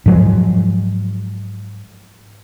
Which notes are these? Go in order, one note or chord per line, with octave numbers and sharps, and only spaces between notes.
G#2 F3 F#3 G#3